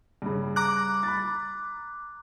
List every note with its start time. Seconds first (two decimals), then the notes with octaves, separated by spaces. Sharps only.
0.22 G2 C#3
0.56 A#5 D6 F#6
1.03 B5 A6